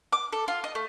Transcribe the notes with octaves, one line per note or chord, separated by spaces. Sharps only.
D6
A4
F4
D#5
A3